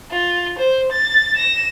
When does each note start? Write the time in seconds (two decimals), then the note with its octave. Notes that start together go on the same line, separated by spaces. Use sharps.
0.11 F4
0.59 C5
0.92 A6
1.36 A#6 E7